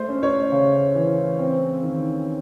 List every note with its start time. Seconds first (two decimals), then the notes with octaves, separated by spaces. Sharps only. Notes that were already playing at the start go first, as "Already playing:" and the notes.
Already playing: A3 C5
0.08 C#4
0.23 C#5
0.52 C#3
0.95 E3
1.39 C4
1.82 D#3